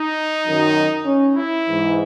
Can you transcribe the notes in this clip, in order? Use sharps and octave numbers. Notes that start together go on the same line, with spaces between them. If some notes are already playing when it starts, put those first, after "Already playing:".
Already playing: D#4
F#2 D#3
C#4
E4
G#2 E3